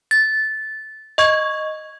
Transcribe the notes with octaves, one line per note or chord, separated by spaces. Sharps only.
A6
D#5 C#6 G#6